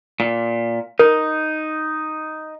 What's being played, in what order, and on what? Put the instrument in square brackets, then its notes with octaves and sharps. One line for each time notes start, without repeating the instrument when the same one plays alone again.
[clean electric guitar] A#2
[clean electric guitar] D#4 [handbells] A#4